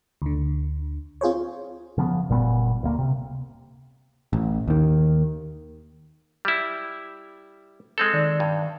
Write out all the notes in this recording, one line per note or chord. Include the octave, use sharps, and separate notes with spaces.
D2 D3
C4 F4 G#4 C5 C#5
C#3 F3 A#3 B3
F#1 A#2 G3 B3
D2 A#3
C3
A1
D#2 D#3
G3 E4
G#3 C4 A4
D#3 D5
G2